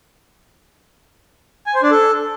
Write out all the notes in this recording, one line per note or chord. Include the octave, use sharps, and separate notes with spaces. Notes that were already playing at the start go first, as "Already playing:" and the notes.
G#5
C5
D4
A4